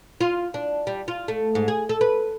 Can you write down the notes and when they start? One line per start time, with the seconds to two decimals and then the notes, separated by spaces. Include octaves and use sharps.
0.21 F4
0.54 D4
0.87 G3
1.08 F4
1.28 A3
1.55 G#2
1.68 G#4
1.89 A4
2.01 B4